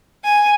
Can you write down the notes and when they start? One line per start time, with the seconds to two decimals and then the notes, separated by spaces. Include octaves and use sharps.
0.24 G#5